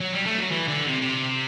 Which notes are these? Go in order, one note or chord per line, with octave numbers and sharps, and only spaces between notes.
F#3
G3
A3
F#3
E3
D3
C3
C3